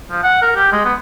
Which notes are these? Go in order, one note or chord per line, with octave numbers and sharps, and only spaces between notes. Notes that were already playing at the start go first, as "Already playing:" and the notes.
F3
F#5
A#4
G4
G#3
B3